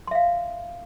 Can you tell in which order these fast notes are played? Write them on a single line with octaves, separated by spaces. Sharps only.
C6 E5 F5